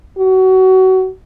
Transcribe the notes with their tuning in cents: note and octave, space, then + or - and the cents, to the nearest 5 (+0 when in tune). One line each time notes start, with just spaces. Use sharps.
F#4 +25